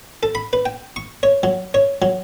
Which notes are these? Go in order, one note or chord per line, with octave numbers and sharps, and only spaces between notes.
A4
B5
B4
G5
C#6
C#5
F#3
C#5
F#3